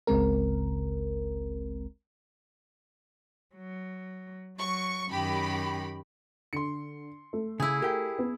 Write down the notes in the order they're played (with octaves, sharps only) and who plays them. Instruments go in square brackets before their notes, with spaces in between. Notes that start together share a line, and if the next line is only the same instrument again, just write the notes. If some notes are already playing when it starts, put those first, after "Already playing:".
[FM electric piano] G1 C#2 C#3 G#3 C4 A#4
[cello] F#3
[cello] F#3 [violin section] C#6
[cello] F#2 D#3 [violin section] G4 B5
[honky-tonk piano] D3 [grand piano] C6 C#7
[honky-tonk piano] A3
[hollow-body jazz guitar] C#3 [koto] E4 G#4
[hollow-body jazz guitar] G4 G5 [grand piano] A#4
[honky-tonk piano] B3